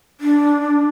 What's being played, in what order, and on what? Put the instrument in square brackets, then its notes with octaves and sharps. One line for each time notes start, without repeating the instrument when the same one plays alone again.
[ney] D4